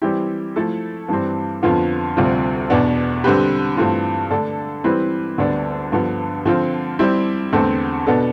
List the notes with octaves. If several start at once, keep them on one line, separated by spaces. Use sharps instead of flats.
E3 G3 C4 E4 G4
F3 A3 E4 A4
G2 E3 G3 C4
F2 D3 F3 B3 F4
D2 C3 G3 C4 F4
E2 B2 B3 D4
D3 G3 C4 G4 B4
G2 E3 A3 C4 F4
D3 A3 D4 A4
E3 G3 C4 E4 B4
D2 D3 G3 B3 D4
G2 D3 F3 B3
D3 F3 C4 F4
G3 C4 E4 G4
E2 D3 A3 C4
B2 B3 D4 A4